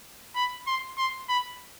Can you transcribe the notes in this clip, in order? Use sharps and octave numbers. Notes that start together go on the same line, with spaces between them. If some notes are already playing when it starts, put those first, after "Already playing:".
B5
C6
C6
B5